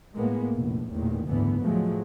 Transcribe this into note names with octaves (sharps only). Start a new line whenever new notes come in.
A2 G#3 A#3 B3
F1 A#1 A2
A1 E2 A#2 D#3
F#1 D2 G#2 D3 E3 B3
A2 F3 F#3 G#3 A3